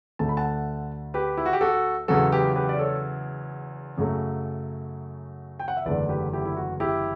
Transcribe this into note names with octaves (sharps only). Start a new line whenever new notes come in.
D2 D3 A3 A5
B5
F#5 A5
G4 B4
E4
F#4
G4
F#4 A4
E2 C#3 F#3 F#4 A4
G4 B4
G4 B4
D5
A4 C#5
F#2 C#3 F#3 A3
G5
F#5
E5
F#1 E2 D3 A3 B4 D5
G4 B4
E4 G4
E4
F#4
E4 G4